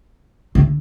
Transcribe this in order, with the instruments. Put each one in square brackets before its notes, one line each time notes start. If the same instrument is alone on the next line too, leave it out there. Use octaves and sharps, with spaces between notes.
[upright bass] D3